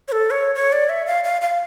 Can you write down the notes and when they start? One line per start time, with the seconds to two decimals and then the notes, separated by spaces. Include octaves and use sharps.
0.08 C#5
0.12 A4
0.31 C#5
0.55 C#5
0.72 D5
0.89 E5
1.07 F5
1.24 F5
1.42 F5